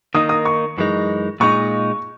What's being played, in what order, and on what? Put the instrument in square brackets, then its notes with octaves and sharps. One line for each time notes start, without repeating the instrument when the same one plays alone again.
[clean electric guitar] D#3 A#3 D#4 [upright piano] D#6
[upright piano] D#6
C#6
[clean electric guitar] F#2 E3 G#3 D#4
[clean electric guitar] A#2 G#3 D#4 [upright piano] C#6